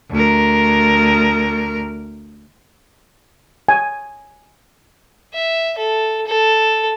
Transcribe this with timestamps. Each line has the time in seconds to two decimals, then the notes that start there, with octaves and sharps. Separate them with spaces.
0.11 D2 A#4
3.69 G#5
5.34 E5
5.78 A4
6.27 A4